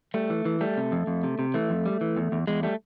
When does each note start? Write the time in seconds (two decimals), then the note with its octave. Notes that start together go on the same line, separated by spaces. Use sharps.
0.14 G3 A3
0.30 E3
0.45 E3
0.61 G3 A3
0.77 C3
0.92 F2
1.07 F2
1.23 C3
1.39 C3
1.54 E3 A3
1.70 F2
1.86 G3
2.01 E3
2.17 E2
2.32 E2
2.47 E2 G#3
2.63 G3 A3